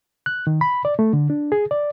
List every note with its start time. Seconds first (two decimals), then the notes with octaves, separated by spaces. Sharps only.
0.26 F#6
0.47 D#3
0.61 B5
0.85 D5
0.99 A3
1.13 D3
1.30 D4
1.52 G#4
1.71 D5